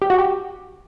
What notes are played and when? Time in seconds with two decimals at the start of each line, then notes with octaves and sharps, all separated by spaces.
0.02 G4
0.10 F#4
0.18 G4